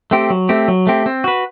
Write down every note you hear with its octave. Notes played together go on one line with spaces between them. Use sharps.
A3 C4 G4
F#3
A3 C4 G4
F#3
A3 C4 G4
C4
F#4 B4